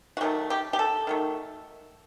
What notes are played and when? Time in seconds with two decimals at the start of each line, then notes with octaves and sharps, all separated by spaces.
0.17 F#4
0.21 D#3 F#3 A3 G4
0.50 G4
0.73 G4
0.79 A4
1.07 D#3 F#3 A3